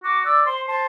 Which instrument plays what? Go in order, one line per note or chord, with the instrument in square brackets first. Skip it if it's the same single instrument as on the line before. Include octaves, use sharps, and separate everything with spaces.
[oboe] F#4 [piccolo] D6
[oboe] D5 [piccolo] E6
[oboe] C5 [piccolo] C6
[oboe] C5 [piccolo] A5